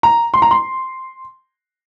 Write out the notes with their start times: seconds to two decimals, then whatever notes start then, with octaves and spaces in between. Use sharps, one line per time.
0.03 A#5
0.34 C6
0.42 A#5
0.51 C6